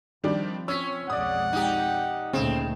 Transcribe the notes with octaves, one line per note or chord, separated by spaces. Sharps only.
D#3 F3 G3 C4 D4
C#4 C#5 E6 B6
B1 F2 G#3 D5 F#5 D#6
D#4 G4
D2 A#2 C#3 A3 C4